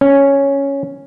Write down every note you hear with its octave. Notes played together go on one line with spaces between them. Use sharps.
C#4